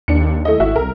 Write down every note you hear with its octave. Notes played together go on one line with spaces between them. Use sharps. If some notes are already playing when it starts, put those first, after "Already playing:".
D#2 D4 C#7
A3 E4 D#5
G#1 E4 F#4 E5
C2 A#4